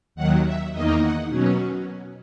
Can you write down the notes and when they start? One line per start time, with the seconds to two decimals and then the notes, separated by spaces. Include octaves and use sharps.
0.15 D#2 D#3 F#3 F#5
0.44 E5
0.72 E2 D#3 A#3 D#4 D#5
1.01 F#5
1.29 B2 F#3 C#4